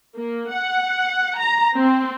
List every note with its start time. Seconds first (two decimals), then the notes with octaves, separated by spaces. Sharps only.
0.17 A#3
0.53 F#5
1.39 A#5
1.78 C4